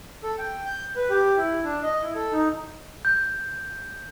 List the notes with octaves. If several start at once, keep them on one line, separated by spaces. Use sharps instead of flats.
A4
G5
G6
B4
G4
E4
D4
D#5
E4
A4
D#4
G6